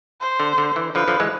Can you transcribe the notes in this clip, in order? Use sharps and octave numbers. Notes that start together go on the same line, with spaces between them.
C5
D3
D3
E3
D3 F3 B4
D3 F3
E3 G#3